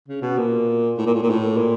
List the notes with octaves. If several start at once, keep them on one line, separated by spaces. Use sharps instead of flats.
C#3
B2
A#2
A2
A#2
A2
A#2
A2
A#2